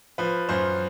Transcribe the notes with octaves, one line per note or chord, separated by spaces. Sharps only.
F3 B4
F#2 C5